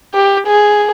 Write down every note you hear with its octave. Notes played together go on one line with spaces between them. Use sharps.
G4
G#4